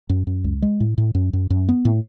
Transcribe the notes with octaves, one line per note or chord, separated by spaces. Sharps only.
F#2
F#2
C#2
G#3
A2
A2
F#2
F#2
F#2
B3
A2